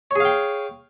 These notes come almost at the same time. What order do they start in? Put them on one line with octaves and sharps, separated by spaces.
C#5 G#4 F5 G5